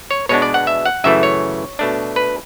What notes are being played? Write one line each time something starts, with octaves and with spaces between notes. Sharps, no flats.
C#5
B2 G#3 B3 D4 C#5
D5
F#5
E5
F#5
F#2 C#3 E3 A3 E5
C#5
B2 A3 D4
B4